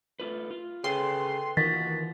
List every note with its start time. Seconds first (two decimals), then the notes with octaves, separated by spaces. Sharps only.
0.20 A3 F4 B4
0.51 F4
0.84 C#3 A4 B4 G5 C6
1.57 D#2 D#3 E3 B3 F4 F#4 A6 B6